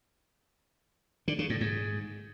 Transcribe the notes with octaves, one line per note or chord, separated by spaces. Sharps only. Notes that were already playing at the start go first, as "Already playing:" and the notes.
D3
C#3
A2
G#2